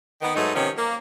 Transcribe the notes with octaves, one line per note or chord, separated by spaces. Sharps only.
D#3 B3
G#2 F#3 A3 B3 D#4
C3 D#3 F3 B3 C#4
A#3